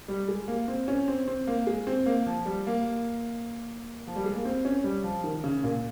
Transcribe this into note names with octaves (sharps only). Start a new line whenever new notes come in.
G3
G#3
A#3
C4
C#4
C4
C4
A#3
G#3
C4
A#3
F3
G3
A#3
F3
G3
G#3
A#3
C4
C#4
G3
F3
D#3
C#3
A#2